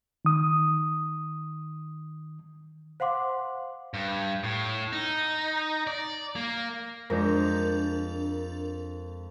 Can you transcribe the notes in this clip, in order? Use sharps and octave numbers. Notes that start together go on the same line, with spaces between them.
D#3 D#6
C5 F5 F#5 C6 D6
G2
A2
D#4
D5
A#3
F2 G#3 D4 A#4 G6